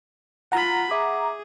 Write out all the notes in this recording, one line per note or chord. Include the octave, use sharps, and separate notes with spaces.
F4 F#5 A#5 B5
G#4 E5 D6